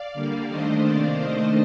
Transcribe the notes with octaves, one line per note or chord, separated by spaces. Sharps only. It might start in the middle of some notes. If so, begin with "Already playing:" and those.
Already playing: D5 F5
D3 G3 A#3
D#3 A3 D4 C5 D#5
C3 D#3 A#3 D4 D5 F5
D#3 A3 D4 C5 D#5